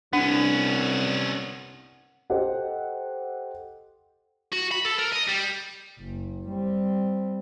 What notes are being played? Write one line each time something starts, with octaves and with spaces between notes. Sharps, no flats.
C2 B3 C#4 D4 F#5
G4 A4 C5 D#5 F#5
F#4
B5
A4
A#4
D#5
G3
F#1
G3 C4